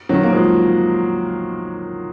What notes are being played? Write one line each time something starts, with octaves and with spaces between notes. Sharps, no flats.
D#3 F#3
A#3
F3 G#3